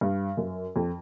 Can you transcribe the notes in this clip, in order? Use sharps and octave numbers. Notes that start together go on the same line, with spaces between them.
G2
F#2
F2